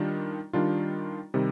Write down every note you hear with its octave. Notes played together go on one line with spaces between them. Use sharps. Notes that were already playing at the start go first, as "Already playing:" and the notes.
Already playing: D#3 G3 D4 F4
D#3 G3 D4 F4
C3 D#3 G3